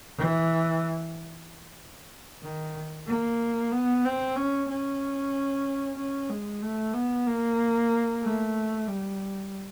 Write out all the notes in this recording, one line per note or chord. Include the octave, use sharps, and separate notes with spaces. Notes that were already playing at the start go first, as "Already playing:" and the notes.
E3
D#3
A#3
B3
C4
C#4
C#4
C#4
G#3
A3
B3
A#3
A3
G3